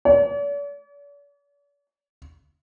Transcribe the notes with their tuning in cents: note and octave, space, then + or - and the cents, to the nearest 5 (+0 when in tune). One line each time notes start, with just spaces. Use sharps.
D5 -45